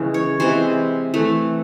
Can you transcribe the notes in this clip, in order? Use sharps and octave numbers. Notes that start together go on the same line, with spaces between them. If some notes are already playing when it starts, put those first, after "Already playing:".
Already playing: C#3 E3 G#3
C#5
C3 E3 G#3 C5
E3 A3